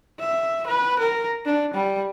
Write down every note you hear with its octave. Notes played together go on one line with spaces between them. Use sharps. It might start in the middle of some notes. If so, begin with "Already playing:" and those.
E5
B4
A#4
D4
G3